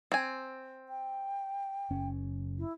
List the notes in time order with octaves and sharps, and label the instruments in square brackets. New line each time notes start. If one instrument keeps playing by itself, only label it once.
[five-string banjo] C4 G#5
[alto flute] G5
[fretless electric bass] F#1 C#4
[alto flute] E4